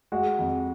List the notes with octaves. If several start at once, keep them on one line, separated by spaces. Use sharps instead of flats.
G#3 F#4
F2